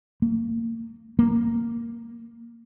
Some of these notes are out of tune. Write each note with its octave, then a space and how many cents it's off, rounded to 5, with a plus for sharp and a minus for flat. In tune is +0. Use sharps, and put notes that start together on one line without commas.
A#3 -30
A#3 -5